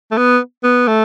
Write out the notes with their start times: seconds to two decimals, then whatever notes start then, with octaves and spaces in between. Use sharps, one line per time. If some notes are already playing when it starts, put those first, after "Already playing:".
0.12 A3
0.18 B3
0.64 B3
0.88 A3